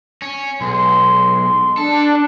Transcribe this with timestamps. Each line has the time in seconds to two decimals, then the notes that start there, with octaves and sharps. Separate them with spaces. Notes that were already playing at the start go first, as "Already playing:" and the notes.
0.22 C#4
0.61 B1 G#3 C6
1.78 D4 A4